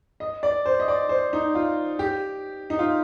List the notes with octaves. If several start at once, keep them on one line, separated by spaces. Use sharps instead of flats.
D#5
D5
C5
D#5
D5
C5
D#4
F4
G4
D#4
F4